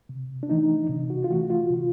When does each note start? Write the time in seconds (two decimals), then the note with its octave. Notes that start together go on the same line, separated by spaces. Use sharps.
0.09 C3
0.43 D4
0.50 E3 A3 D#4
0.89 C3
1.10 F#4
1.24 F4
1.30 E3 A3 F#4
1.50 F4
1.71 C3